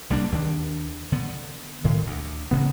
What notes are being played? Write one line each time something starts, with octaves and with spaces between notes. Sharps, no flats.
C2 G3 A#3 D4
D#2 D#3 D4
D3 B3
A2 D#3
D2
A1 C#3 B3